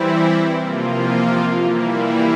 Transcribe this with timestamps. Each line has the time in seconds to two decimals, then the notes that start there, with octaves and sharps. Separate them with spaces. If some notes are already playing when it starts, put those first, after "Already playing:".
Already playing: E3 G3 C4 E4
0.56 C3 F3 A#3 F4
1.61 E3 G3 A#3 E4